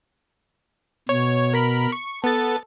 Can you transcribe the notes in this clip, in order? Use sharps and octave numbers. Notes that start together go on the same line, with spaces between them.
B2 C#5
A#4 B5
C#6
B3 A4 A6